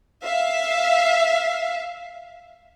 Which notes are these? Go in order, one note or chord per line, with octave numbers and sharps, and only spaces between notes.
E5 F5